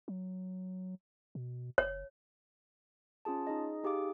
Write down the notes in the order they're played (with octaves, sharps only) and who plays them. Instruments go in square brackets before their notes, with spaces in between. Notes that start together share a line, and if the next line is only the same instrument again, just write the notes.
[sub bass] F#3
B2
[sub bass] F#1 [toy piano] C#5
[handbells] C#4 F4 G#4 A5
D#4 G#4 D#5
D#4 G4 G#4 F5 D6